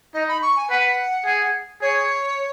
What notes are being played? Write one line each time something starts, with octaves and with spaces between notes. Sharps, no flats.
D#4 D#5
B5
C#6
G#5
B4 F#5
G#4
G#4 C#5